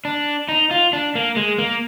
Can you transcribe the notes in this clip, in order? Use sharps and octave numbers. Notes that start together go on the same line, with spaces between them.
D4
D#4
F4
D4
A#3
G#3
A#3